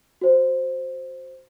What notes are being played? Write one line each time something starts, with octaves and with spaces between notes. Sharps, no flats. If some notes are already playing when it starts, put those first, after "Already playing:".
F#4 C5